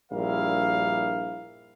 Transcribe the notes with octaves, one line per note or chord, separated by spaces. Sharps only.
A#1 G2 G3 E4 A#4 F5